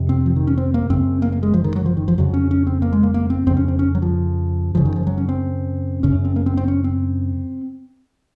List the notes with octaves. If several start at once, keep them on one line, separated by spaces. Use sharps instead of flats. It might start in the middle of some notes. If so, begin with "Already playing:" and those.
Already playing: F2 C3
C4
F3
D#3
C#4
C4
A#3
F#2 C#3 C4
A#3
A#3
G#3
F3
D#3
F#3
F3
D#3
F3
F2 C#3 F#3
C#4
C#4
C4
A#3
G#3
A#3
A#3
C4
F2 C#3 C4
C#4
C4
C#4
F#3
F3
F#2 C#3 F3
D#3
F3
F#3
C#4
C4
F#2 C#3 C#4
C4
A#3
C4
C4
C#4
C4